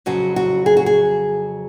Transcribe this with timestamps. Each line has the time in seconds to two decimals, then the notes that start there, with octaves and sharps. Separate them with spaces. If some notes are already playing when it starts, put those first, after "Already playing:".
0.06 F2 C#3 F#3 F#4
0.36 F#4
0.66 G#4
0.77 F#4
0.86 G#4